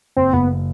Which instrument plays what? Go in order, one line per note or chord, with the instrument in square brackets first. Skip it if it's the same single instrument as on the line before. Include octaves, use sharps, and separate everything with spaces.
[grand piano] F#1 [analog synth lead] C4
[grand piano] F#1 [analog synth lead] B3